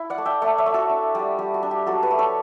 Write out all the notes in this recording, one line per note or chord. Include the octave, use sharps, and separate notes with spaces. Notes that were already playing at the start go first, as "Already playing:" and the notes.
Already playing: E4
D5 F#5
A3
E5 G5
A3 D5 F#5
C#5 E5
A3
F#4 A4
D4
G3
G3 G4
F#4
D4
G4
F#3 F#4 A4
G4 B4
A3
A4 C#5